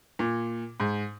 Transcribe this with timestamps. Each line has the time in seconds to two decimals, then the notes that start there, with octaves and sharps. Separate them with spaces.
0.19 A#2
0.80 G#2